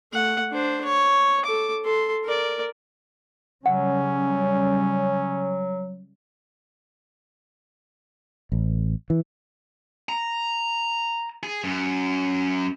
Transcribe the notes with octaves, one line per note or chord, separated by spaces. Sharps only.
A3 F#5
D4 C5
C#5
A4 D6
A4 C6
A#4 D5
C#3 F#3 G3 C#4 F#5
A1
E3
A#5
G#4
F#2